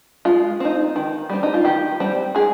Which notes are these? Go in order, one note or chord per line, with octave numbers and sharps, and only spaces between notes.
G#3 F4
C4 D#4
D#3
G3 C4
D#4
F4
D#3 G4
G3 C4
G#3 G#4